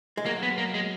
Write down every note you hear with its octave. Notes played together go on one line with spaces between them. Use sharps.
G#3
F#3 A#3
B3
A#3
G#3